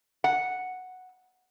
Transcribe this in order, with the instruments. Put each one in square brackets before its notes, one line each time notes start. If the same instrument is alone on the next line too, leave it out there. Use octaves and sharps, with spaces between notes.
[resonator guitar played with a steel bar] F#5